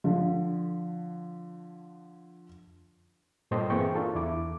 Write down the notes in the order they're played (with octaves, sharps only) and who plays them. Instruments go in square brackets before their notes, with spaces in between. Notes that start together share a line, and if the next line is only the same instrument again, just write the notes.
[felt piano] D3 F3
[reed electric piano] G2 A#2 A4 C5 D#5 G5
E3 A#3 C4 G#4 G5 C#6
D4 F4 A4 A#4
E2 E4 D6